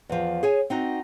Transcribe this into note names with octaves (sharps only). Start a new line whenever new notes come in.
E2 F3
G#4 C#5 G#5
C4 D#4 F#4